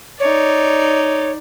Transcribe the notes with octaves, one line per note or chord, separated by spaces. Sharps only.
D#4 C#5 D5